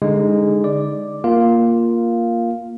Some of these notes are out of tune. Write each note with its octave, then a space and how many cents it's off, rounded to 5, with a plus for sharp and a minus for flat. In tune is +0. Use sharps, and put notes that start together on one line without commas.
D3 -25 G#3 -15 D#4 +0
D5 +0 D6 +0
A#3 +0 F4 +0 F5 +0